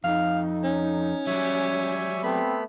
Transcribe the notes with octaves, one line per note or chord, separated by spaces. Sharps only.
F2 D#4 F5
C#4
F#3 G3 C#5 E5 G#5
A3 B3 C4 B5